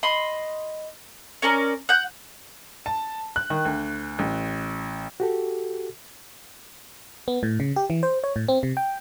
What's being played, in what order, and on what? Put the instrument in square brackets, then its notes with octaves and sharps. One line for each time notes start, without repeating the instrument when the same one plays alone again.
[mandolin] D#5 B5 C6
C#4 A#4 D5 A#5
F#5 G6
[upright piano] A5
F#6
D#3
D2
A1
[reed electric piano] F#4 G4 A4
[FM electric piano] B3
A2
C#3
G4
E3
C5
C#5
A2
C4
C3
G5